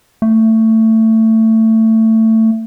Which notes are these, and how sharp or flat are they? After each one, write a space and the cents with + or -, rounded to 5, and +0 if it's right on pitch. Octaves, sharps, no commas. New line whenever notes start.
A3 +20